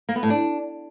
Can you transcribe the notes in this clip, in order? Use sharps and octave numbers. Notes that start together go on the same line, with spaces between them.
A#3
B3
A2
D4